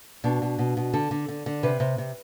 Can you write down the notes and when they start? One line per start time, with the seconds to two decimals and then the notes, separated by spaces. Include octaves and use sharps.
0.24 B2 D4
0.42 B2
0.59 B2
0.77 B2
0.93 D3 A4
1.11 D3
1.28 D3
1.46 D3
1.63 C3 B4
1.80 C3
1.98 C3